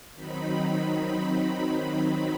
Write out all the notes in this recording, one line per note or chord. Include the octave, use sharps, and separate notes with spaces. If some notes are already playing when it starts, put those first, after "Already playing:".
D#3 F#3 C4 D#4 B5